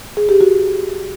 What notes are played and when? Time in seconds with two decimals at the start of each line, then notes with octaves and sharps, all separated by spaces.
0.17 G#4
0.29 G4
0.41 F#4